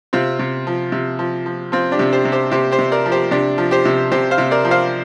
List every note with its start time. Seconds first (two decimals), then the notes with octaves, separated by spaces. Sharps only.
0.13 C3 C4 F4
0.39 C3
0.67 F3
0.92 C3
1.19 F3
1.46 F3
1.72 F3 C4 F4
1.92 D4 G4
1.99 C3
2.13 G4 C5
2.25 C3
2.32 G4 C5
2.52 C3 G4 C5
2.72 G4 C5
2.79 C3
2.92 A#4 D5
3.06 F3
3.12 G4 C5
3.31 C3 D4 G4
3.58 F3
3.71 G4 C5
3.85 C3
4.12 C3 G4 C5
4.31 C5 F5
4.38 C3
4.51 A#4 D5
4.65 F3
4.71 C5 F5